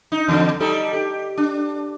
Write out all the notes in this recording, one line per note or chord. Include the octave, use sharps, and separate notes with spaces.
D#4
E2 D3
G3 D#4 A4
G4
D4